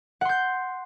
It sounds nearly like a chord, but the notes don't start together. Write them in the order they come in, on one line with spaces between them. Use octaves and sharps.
F#5 C6 G6